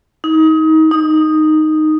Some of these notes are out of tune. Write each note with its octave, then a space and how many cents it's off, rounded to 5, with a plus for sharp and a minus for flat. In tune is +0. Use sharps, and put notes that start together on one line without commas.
D#4 +25
D#4 -5